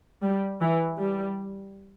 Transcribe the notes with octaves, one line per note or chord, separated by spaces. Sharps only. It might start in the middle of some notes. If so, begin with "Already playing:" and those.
G3
E3
G3